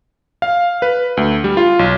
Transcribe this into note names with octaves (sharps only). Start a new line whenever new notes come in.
F5
B4
D2
G3
F4
B1